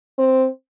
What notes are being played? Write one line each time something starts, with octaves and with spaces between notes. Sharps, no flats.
C4